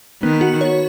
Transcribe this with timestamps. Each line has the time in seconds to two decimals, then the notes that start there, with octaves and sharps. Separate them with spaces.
0.23 D#3 B3
0.41 F#4
0.61 C#5